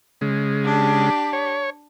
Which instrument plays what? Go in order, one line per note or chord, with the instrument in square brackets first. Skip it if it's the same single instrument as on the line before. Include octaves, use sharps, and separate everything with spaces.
[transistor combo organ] C#3 G#3
[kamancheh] D4 G4
[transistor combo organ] C#5